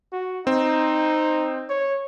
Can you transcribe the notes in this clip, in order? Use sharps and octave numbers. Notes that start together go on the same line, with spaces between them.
F#4
C4 D#4
C#5